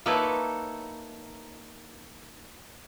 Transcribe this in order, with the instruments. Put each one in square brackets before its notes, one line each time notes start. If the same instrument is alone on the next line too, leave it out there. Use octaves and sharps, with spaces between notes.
[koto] A#3 D#4 E4 A4 B4 C#5